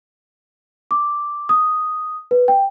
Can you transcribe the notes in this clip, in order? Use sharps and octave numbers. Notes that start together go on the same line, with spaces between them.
D6
D#6
B4
G5